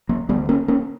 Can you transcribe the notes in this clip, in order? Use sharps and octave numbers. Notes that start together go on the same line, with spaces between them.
F#3 A#3
D2 D3 G3 B3
A#3 C#4
A#3 C#4